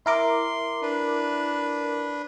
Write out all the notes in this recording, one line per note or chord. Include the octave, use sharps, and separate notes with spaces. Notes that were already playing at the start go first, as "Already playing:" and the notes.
E4 A#4 C6 D6
D4 B4